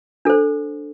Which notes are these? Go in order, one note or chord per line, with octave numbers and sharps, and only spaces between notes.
D4 A4 C5